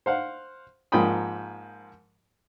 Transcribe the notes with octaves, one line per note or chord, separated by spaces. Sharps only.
C5 F5 F#5
G#2 F3 A#3 G5 B5 D#6